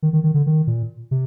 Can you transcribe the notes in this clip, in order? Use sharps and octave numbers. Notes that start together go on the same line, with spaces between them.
D#3
D#3
D#3
D3
D#3
A#2
C3